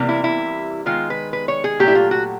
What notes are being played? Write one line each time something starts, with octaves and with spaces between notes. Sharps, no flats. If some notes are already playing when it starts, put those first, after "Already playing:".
Already playing: C3 E3 G3 A#3
E4
E4
D#3 G#3 F4
B4
B4
C#5
G#4
A#2 F#3 A3 G4
E4
F4
F#4